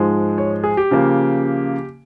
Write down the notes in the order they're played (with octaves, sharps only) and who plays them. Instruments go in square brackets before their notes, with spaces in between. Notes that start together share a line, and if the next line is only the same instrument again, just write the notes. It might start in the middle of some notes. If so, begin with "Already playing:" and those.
Already playing: [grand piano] G#2 F3 G#3
C#5
G#4
G4
C#3 F3 A#3